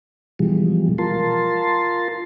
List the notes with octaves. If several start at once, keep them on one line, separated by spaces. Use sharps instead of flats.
B2 E3 F3 G3 G#3
F4 A#4 A5 C6